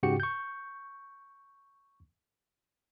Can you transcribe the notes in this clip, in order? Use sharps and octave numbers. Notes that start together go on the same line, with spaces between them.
G#2 C#3 F#4 G4 G5 C#7
C#6 G6